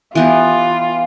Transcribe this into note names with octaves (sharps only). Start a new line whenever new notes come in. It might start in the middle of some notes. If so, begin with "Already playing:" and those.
E3 B3 F4 G4